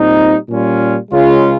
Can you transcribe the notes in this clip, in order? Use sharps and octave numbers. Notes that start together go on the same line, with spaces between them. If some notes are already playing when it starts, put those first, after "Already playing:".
Already playing: A#2 G3 C4 D#4
A#2 G3 C#4 F4
C#2 C#3 G#3 C#4 F4